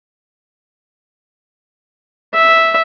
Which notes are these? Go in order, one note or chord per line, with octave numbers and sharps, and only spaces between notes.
E5